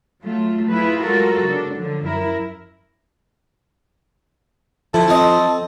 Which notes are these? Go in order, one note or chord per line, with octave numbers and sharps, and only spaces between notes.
F#3 A3 F4
E4 F4 G#4 B4
F#3 G#3 F4 F#4 A4 A#4
C#3 D4
D3 F3 F#3
F#2 E4 A#4
F3 E4 A4
C4 D#5